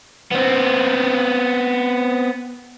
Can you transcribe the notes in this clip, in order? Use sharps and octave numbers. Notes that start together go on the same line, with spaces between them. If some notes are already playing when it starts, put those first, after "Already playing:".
B3 C4